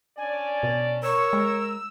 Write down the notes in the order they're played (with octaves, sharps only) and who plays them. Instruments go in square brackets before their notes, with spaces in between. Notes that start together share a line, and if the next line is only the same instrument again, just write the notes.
[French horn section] C#4 D4 D5 [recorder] G#5
[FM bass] B2
[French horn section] A#4 [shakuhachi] C#5 [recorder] E6
[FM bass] G#3